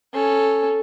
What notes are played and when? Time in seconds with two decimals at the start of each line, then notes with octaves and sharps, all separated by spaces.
0.14 C#4 A4